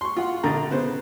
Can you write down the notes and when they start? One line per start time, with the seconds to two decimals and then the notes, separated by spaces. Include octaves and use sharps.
0.01 C6 C#6
0.17 F4 F#5
0.43 A#1 D3 A#5
0.70 C#3 B3 C5